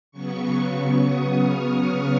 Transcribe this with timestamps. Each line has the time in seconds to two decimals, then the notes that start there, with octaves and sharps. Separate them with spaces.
0.12 C#3 F#3 B3 C#6
1.02 D#6
1.33 F6
1.64 F6